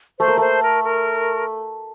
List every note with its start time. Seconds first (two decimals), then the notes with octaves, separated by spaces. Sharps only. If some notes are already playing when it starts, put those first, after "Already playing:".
0.19 A3 C5
0.28 A#3
0.37 A3 C5
0.63 A#4
0.84 A#4